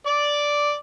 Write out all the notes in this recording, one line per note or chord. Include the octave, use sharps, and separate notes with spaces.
D5 D6